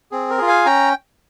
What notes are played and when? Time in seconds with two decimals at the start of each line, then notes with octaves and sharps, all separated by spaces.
0.11 C4 G#4
0.30 A#4
0.38 F4 G#4
0.48 F5 G#5
0.66 C#4 G5 A#5